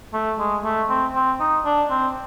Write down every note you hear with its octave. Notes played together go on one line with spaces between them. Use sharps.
A3
G#3
A3
C4
C4
D#4
D4
C4